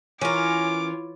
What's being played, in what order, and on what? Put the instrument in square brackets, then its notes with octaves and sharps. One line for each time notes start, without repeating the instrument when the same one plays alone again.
[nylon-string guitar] E3 [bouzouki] C#4 A#4 [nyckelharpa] F4 C#5 [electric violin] D6